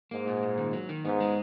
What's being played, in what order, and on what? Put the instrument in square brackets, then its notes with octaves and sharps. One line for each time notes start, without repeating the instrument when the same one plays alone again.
[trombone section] G#2 [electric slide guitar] A#3
[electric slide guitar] A#2
A#2
D#3
F#3
D#3
[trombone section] G#2 [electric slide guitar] B3
[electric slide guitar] G#3